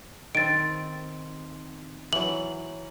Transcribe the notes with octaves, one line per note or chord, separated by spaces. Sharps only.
D#3 C4 A6 D7
E3 F#3 F#7